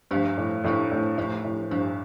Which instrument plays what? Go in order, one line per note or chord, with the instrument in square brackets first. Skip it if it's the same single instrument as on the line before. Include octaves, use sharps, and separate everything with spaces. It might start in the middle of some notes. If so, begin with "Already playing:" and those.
[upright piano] G2 [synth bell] F3 A3 D4 G4 C5
[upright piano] A2
[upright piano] A2 [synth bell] F3 A3 D4 G4 C5
[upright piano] A2
[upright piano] A2 [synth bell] F3 A3 D4 G4 C5
[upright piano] A2
[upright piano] G2 [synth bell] F3 A3 D4 G4 C5